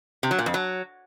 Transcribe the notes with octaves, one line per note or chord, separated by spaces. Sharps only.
C3
F#3
A#2
F2
F#3